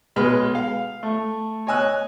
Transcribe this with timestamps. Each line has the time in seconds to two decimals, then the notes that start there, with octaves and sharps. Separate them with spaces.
0.16 B1 G#3 B4 B5 F6
0.55 F5
1.03 A3
1.67 C#5 D#5 G#5 E6 F#6